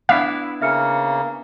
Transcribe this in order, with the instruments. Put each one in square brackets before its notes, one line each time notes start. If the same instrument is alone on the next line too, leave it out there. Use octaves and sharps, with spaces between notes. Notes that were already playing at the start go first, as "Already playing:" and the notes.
[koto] B3 D4 E4 [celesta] E5 [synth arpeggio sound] F5
[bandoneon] C#3 A#3 [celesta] E5 F6 C#7